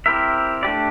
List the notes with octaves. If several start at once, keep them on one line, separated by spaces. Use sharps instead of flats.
C4 E4 G4 A#4 E5
A3 D4 G4 D5